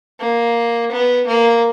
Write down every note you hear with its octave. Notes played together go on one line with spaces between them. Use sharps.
A#3
B3
A#3